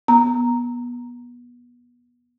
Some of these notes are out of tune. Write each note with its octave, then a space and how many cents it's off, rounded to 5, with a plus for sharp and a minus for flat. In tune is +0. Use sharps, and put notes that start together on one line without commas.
B3 -25 A#5 -5